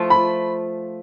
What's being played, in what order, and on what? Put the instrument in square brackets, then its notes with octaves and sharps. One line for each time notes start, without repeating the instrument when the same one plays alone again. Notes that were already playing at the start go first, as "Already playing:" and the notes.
Already playing: [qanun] F3 A3 F4
[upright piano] B5